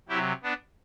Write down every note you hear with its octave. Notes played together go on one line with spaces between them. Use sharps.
C3 F#3 E4 G4
B3 D4